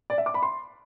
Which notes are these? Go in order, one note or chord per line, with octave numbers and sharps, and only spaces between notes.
D5
E5
D6
B5
C6